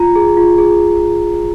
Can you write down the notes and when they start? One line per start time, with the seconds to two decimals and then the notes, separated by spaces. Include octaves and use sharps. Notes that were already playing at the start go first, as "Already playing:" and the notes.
Already playing: F4 A#5
0.15 G#4
0.37 F4
0.58 G#4